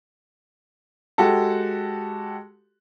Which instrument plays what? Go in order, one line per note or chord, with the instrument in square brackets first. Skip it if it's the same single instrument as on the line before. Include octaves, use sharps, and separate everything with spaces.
[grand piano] G#3 F#4 G4 A4